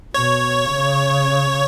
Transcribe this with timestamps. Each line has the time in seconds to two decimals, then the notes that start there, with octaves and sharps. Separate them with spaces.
0.14 B2 C#5
0.71 C#3